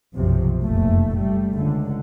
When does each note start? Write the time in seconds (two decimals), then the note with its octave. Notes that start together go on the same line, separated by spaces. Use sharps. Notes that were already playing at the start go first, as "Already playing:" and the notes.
0.14 B1 F#2 C3 F3
0.62 F1 F#2 A#2 A3
1.15 G3 A3
1.55 C#2 D3